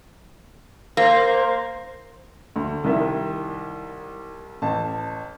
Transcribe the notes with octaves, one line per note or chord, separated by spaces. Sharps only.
A#3 C5
D2
C2 D#3 E4 E5
A1 A5